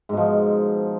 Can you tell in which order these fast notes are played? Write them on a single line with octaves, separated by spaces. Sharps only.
G#2 B2 F3